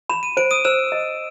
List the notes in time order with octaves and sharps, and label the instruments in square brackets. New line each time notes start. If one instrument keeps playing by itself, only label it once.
[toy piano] B5 [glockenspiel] E7
[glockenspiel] D#7
[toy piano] C5 [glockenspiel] D7
[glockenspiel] D#6 D#7
[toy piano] C5 [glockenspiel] E6 E7
[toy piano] D#5